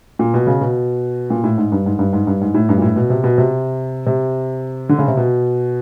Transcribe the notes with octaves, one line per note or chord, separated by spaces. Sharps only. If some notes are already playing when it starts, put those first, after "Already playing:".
A#2
B2
C#3
B2
A#2
A2
G#2
G2
G#2
G2
G#2
G2
G#2
A2
G2
A#2
A2
B2
C3
B2
C3
C3
D3
C#3
C3
B2